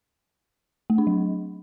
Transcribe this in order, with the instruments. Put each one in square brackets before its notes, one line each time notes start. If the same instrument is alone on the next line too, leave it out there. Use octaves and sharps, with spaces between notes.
[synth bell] A3
D4
F#3